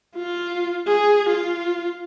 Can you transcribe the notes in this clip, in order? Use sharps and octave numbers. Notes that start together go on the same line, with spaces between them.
F4
G#4
F4